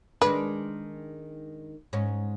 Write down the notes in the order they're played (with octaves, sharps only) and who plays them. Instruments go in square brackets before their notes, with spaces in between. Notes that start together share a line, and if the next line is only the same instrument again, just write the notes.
[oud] D#3 G#3 D4 [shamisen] B4
[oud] G#2 C#4